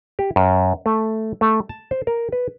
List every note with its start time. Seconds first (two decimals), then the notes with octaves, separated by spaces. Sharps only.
0.19 G4
0.36 F#2
0.86 A3
1.41 A3
1.69 A5
1.91 C5
2.07 A#4
2.32 B4